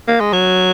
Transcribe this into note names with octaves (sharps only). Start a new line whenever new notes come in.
A#3
G#3
F#3